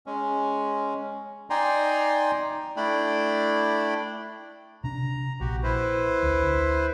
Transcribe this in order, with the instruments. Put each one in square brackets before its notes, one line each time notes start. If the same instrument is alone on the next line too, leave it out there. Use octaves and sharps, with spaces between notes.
[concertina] G#3 C#4
D#4 D5 G5 G#5 A#5 C6
A3 D4 E4 D5 G5 B5
[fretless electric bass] C3 D4 [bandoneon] A#5
[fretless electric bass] A#1 [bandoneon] F#4 G4
[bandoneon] E4 B4 C5
[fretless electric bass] D2